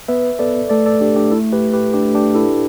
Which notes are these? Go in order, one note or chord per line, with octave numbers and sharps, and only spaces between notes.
B3 B4 E5
B3 A4 D5
A3 A4 D5
A4 D5
D4 G4
D4 G4
E4 A4
G4 B4
G4 B4
D4 G4
D4 G4
E4 A4